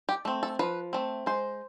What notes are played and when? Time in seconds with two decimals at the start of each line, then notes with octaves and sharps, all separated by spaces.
0.09 G4
0.25 A3 C4
0.43 A4
0.59 F3 B4
0.93 A3 C4
1.26 G#3 C5